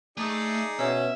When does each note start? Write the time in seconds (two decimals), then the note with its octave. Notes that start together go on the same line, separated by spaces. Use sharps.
0.17 A3 D#4 G#4 D5
0.79 B2 C#4 E5